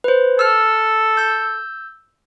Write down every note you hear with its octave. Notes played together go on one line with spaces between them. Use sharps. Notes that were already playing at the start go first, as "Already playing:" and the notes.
B4 C5
A4 E6 F6
E6 G6